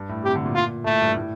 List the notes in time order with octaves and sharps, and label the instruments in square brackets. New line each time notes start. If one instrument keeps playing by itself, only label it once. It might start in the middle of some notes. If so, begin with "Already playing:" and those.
Already playing: [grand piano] G2
A2
[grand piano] C3 [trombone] G4
[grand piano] D3
A#2
[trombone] F4
[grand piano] A2 [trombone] A3
[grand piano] G2
A2